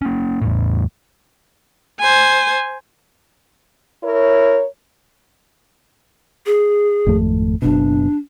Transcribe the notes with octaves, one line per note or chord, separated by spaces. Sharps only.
A#3 C#4
E2 A2
C5 G#5
E4 A#4 C#5
G#4
G#1 F2 A3
F#1 B2 D4